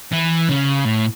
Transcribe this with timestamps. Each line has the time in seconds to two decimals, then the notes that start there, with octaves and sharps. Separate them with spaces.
0.13 E3
0.49 C#3
0.85 A2